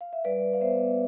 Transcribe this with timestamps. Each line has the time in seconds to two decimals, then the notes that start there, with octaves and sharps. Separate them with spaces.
0.01 F5
0.13 E5
0.25 G3 B4 D5
0.43 G3
0.54 F5
0.61 B3 C5 E5
0.79 B3